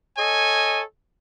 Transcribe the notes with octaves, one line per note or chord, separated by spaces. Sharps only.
A4 C#5 D#5 G#5